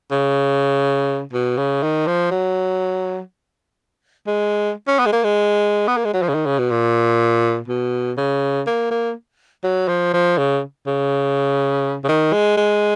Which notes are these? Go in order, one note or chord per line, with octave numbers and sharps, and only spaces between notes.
C#3
B2
C#3
D#3
F3
F#3
G#3
C#4
B3
G#3
A#3
G#3
B3
A#3
G#3
F#3
F3
C#3
D#3
C#3
B2
A#2
B2
C#3
A#3
A#3
F#3
F3
F3
C#3
C#3
C#3
D#3
G#3
G#3